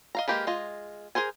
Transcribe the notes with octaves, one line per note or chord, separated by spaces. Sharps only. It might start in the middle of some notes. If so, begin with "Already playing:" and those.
D#5 F5 A#5
G#3 A#3 G4 A#4 B4
G#3 F4 D#5
G#4 A#4 C5 G#5